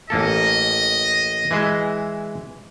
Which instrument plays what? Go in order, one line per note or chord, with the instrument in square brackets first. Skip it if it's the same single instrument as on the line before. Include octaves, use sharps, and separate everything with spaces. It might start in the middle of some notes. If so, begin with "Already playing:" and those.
[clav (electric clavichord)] A1 A#3 A4 [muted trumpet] D#5
[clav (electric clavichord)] E3 G#3 E5